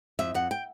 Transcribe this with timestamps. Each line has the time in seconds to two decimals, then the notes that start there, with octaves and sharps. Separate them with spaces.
0.19 F2 E5
0.34 F2 F#5
0.51 G5